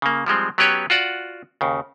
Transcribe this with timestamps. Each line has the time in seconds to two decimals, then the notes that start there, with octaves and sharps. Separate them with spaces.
0.02 C#3 A#3
0.26 F3 G3 G#3 C4
0.58 F#3 B3 C#4 G4 B4 C#5
0.90 F4 F#4 D5 F#5
1.61 D#2 C#3